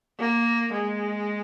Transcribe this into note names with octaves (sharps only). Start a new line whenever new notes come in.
A#3
G#3